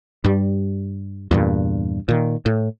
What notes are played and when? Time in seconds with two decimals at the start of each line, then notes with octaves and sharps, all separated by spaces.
0.24 G2 G3
1.31 E2 G2 A#2
2.09 A#2 D#3
2.46 A2